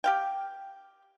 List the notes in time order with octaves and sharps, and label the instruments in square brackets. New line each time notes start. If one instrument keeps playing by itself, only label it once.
[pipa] G4 F5 G5